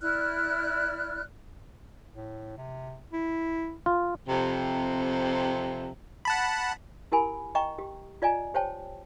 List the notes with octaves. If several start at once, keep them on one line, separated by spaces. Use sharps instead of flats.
E4 D5 F6 F#6
A2
C3
E4
F4
F2 C3
F#5 A5 B5
E4 G4 A#4 G#5 B5
D#5 G5 A#5 C#6
G4
F4 D5 D#5 G#5 A#5
G4 C5 C#5 G5 A5